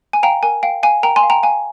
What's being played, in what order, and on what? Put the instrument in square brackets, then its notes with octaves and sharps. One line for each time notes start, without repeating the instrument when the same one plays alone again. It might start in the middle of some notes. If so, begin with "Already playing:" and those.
[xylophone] G#5
F5 G5 A#5
A#4 G#5
F5 G5
F5 G#5
A#4 G5 A#5
G#5 C6
F5
G5 A#5
F5 G#5